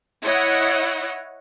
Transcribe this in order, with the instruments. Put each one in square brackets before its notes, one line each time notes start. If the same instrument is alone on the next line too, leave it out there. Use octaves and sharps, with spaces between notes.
[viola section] E4 C#5 D#5 F#5